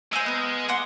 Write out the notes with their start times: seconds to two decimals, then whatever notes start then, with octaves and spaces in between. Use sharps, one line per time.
0.13 G#3 C5 G#5 E6
0.26 B3 A#4
0.68 F#5 C6 D6